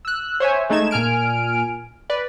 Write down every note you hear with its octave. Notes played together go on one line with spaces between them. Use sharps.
E6 F#6
C5 C#5 E5 G#5
G#3 A3 D#4 G#6 E7
A#2 G#5 F6 D7
B4 D5